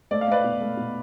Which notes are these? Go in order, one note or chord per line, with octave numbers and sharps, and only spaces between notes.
A3 D5
F5
A3 B4 D5
B2
A3
B2